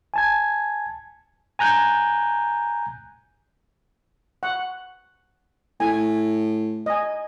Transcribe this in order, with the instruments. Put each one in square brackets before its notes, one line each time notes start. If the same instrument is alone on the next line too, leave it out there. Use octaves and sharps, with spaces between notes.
[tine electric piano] G#5 A5 G#6
G#5 A#5 F#6 G6
[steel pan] F#5
[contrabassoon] A2 [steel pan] G#5
[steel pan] D#5 G#5